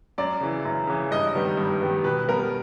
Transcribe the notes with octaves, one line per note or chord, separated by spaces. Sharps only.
F#2 D5
C#3 E3
F#2
C#3 E3
G2 D#5
D#3 G3 B3
G2
D#3 G3 B3
B2 B4
G3 B3 A#4